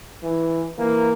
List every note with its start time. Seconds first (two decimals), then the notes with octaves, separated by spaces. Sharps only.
0.23 E3
0.78 E3 A#3